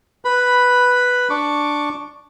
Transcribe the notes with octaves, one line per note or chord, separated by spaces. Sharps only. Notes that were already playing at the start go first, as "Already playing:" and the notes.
B4 B5
D4 C#6 D6